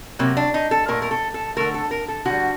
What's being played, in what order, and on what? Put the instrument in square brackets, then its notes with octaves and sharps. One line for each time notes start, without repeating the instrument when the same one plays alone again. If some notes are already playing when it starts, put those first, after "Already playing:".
[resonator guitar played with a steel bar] C3 F#3 A#3
D4
D#4
A4
A#2 A3 A#4
A#4
A4
A4
D3 A3 A#4
A4
A#4
A4
D3 G3 F#4